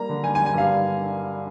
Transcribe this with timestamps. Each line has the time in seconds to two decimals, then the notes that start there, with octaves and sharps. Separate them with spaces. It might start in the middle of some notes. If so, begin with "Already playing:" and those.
Already playing: G3 A#3 A#5
0.09 D3
0.24 G3 G#5
0.35 G#5
0.39 G3
0.46 G#5
0.54 G2 F5
0.68 G3